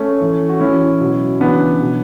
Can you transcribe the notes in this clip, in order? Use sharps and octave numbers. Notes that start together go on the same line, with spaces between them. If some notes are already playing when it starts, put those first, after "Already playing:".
Already playing: A3 C#4
A2 E3
F#4
A2 E3 C#4 E4
B2 F#3
C#3 E3 B3 D4
B2 F#3